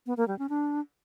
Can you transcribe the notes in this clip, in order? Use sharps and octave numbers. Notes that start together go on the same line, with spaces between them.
B3
A#3
G3
C#4
D4